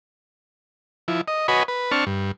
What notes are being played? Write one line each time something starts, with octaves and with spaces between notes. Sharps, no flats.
F3 E4
D#5
F#4 B4 C#5 D#5 G#5 B5
B4
C4 D4 A5 C#6 F6
G2